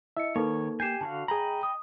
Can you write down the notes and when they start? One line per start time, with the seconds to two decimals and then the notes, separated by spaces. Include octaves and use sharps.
0.17 E4 D#5 E5 C#7
0.36 D#3 A#3 D#4 A4 B4 C#5
0.80 G4 G#5 G6 C7 E7
1.01 D3 F#4 F5 A5
1.28 G#4 D#5 G5 A#5 B5
1.63 D#6